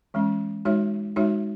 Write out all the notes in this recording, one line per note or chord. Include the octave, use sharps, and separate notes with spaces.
E3 G#3 C#4
G#3 D#4 F#4 C#5 E5
G#3 D#4 F#4 C#5 E5